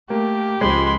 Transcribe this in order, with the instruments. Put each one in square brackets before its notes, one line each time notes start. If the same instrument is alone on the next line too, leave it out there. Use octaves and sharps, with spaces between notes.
[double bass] A3 [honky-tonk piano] A#3 [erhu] G4
[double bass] C#2 [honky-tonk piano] F3 G#3 [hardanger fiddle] B5 C6